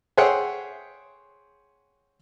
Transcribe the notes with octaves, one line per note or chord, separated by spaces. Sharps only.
G#4 C5 C#5 E5 F#5 G5